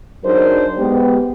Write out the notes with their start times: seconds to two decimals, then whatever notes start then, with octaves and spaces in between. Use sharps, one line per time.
0.24 F#3 D4 D#4 G#4 A#4 C5
0.77 G#3 B3 G4